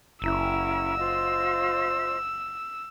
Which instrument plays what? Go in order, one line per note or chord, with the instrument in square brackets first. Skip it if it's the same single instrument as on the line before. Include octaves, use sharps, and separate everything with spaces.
[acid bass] F#1 [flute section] C#4 E4 A#5 [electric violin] E6
[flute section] F4 C5 D#5